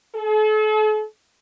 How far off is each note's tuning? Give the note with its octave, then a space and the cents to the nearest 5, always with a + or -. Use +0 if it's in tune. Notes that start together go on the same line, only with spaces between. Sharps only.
A4 -40